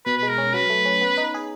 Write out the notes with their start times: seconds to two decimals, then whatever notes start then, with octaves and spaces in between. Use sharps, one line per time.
0.06 B2 B4
0.18 G#3 B4
0.29 A#4
0.38 C#4
0.54 F#3 B4
0.70 A3
0.85 C#4
1.01 B3
1.17 D#4
1.34 G#4